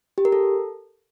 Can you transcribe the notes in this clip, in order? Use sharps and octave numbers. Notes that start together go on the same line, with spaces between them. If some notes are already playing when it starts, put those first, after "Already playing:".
G4
A#4
A4